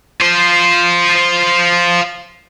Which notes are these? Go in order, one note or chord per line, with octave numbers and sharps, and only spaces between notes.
F4 C5